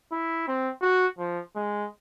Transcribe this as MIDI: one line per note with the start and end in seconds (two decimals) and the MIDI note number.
0.12 0.43 64
0.48 0.71 60
0.81 1.06 66
1.19 1.41 53
1.56 1.88 56